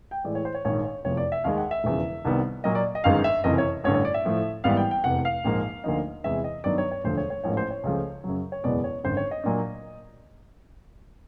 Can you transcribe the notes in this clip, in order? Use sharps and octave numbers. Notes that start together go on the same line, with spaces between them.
G5
A2 E3 G#3 D5
C#5
C5
C#5
A#1 G#2 D#3 C#5
C#5
F1 E2 C3 F3 C#5
D5
E5
D#2 D#3 G#3 F5
F#5
E5
E1 E2 C#3 F3
C2 C3 D#3 G3 B3
A#2 F#3 A#3 D#5
D5
D#5
G1 F#2 D#3 G#3 F5
E5
F#1 F2 C3 E3 D#5
C#5
A1 G2 D3 C#5
C#5
D5
E5
A2 F3 A3
G#1 G#2 E3 G3 B3 F5
G5
G5
F1 E2 C3 F#5
F5
A#1 G#2 F3 A#3
D2 D3 F3 A#3 D#4
E2 C3 E3 G#3 E5
D#5
G2 D#3 F#3 B3 D5
C#5
C#5
E1 D2 D3 F3 A3 C5
C#5
C#5
A1 G#2 F3 A#3 C#5
C5
C#5
C#2 C#3 F3 A3
F#2 C#3 F#3
C#5
F#1 E2 B2 G#3 B3 D5
C#5
G#1 F#2 D3 C5
C#5
D#5
A#2 F#3 A#3 D4